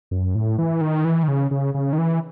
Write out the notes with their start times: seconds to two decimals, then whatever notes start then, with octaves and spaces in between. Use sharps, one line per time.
0.11 F#2
0.35 A2
0.58 E3
0.81 D#3
1.05 E3
1.23 D#3
1.28 C#3
1.51 C#3
1.74 C#3
1.93 D#3
1.98 E3